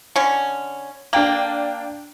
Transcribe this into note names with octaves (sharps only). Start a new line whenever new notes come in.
D3 C#4
A#3 D4 G5 F#7